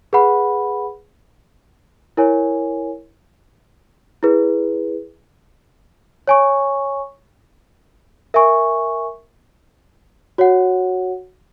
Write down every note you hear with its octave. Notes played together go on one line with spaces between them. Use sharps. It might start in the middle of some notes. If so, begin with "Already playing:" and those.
G#4 B4 F#5 B5
E4 A#4 C#5 G#5
E4 G#4 B4
C#5 G#5 C#6
A#4 E5 G#5 C#6
F#4 C#5 F#5